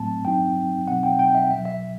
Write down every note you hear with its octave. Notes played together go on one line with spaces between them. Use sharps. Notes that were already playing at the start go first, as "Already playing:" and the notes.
Already playing: A2 F#3 A3 C4 A5
G2 F#3 C4 D#4 G5
B2 F#3 C4 D#4 F#5
G5
G5
E5
C2 B2 F#3 E5
E5